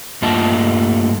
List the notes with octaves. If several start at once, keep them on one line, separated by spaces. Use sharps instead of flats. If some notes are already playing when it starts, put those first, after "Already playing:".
G2 A3 A#3 F4 D#5 A5